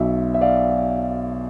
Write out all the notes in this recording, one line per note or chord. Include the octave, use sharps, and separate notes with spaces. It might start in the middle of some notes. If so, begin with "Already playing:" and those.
Already playing: B1 B2 E5
E5
D5 F5